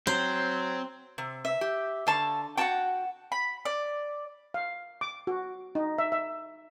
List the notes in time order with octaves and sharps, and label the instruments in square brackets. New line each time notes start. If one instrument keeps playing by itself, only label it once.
[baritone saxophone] F#3 [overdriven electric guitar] C4 [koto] C5
[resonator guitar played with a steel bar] C3
[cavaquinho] E5
[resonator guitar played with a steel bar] G4
[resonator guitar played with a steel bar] D3 [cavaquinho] F5 A5 C#6
[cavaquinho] F#4 A5 C#6 [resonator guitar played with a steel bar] F#5 G5
[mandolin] B5
D5
[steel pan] F5
D6
F#4
D#4
E5
E5